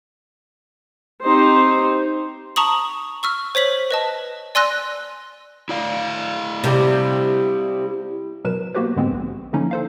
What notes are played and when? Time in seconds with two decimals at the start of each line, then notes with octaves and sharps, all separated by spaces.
1.24 C4 D#4 G4 C5
2.56 A5 A#5 C#6 D#6 F#7
3.23 C#6 E6 F6
3.55 C5 C#5 B6 F#7
3.91 B4 D#5 A5
4.55 D5 G#5 C6 E6 F#6 A#6
5.69 E4 D5 F5
6.64 C3 G3
8.45 B2 F#3 A#4 B4 E7
8.75 A#3 B3 F#4 G4 B4 C5
8.96 G#2 D3 G#3 B3 C4
9.11 A#1
9.53 D3 F3 A#3 C#4 D#4 E4
9.71 A4 C5 F5